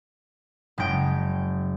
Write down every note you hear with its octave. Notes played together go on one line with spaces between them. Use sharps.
F#1 G#3 G5